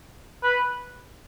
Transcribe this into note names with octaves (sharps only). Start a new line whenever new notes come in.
B4